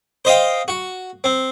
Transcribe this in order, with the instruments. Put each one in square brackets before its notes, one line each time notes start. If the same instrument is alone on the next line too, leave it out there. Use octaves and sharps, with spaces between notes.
[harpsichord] C5 D#5 F5 G5
F#4
C4